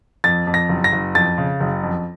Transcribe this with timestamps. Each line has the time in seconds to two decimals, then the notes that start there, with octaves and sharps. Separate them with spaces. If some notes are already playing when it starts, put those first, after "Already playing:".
0.24 F2 A6
0.47 F2
0.54 A#6
0.69 F#1
0.84 A#6
0.92 F#1
1.15 F2 A6
1.38 C#3
1.60 F#1
1.83 F2